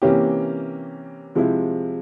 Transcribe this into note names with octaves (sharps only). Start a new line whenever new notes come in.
C3 E3 A#3 C#4 G4
C3 F3 G#3 E4